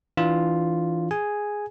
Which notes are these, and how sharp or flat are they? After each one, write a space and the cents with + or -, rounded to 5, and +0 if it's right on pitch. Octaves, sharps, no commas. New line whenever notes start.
E3 +0 D4 +0 F4 +0
G#4 +0 G#5 +0